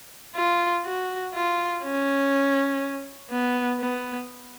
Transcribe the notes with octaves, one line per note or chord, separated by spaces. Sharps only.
F4
F#4
F4
C#4
B3
B3